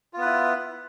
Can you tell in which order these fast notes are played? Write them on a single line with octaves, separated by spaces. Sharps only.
F4 B3 B4 E4